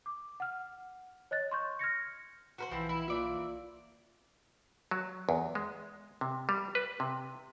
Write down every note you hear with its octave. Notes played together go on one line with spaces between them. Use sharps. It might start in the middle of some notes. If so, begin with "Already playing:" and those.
D6
F#5 F6
C#5 D#5 F#6 A6
C6 C#6 G6
F6 G#6 A#6 C#7
F#4 A#4 C5
B1 E3 F3 C4 E4
E4
E3 A#3 F4 D5 E5
F#3
E2
G#3
C3
G3
B4
C3